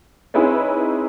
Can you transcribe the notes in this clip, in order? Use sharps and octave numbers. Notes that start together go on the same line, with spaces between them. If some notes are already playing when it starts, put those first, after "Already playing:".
C4 D#4 E4 G#4 B4 C#5